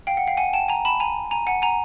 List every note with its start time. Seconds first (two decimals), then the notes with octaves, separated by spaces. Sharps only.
0.07 F5 G5
0.17 F#5
0.27 F5 G5
0.37 F#5 G#5
0.53 G5 A5
0.68 G#5 A#5
0.85 A5 B5
1.00 G#5 A#5
1.31 G#5 A#5
1.47 F#5 G#5
1.62 G#5 A#5